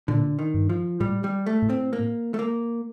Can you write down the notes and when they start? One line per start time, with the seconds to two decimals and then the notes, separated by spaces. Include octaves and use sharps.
0.08 A#2 D3
0.39 D#3
0.54 G2
0.69 F3
1.00 A2 G3
1.24 G3
1.46 A3
1.62 A2
1.70 C4
1.93 A#3
2.34 A3
2.39 A#3